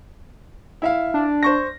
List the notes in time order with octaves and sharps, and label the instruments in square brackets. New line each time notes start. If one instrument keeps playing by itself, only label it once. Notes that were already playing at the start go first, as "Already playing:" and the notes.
[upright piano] E4 E5 F5
[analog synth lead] D4
[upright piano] C5 C#6 A#6